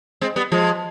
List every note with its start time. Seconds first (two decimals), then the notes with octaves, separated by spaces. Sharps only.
0.21 G#3 C4
0.36 G3 B3
0.52 F3 G#3